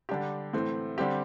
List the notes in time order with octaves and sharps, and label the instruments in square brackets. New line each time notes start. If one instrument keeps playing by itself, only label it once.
[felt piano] D3 G3 D4 G4
A2 E3 A3 C4
D3 G3 C4 G4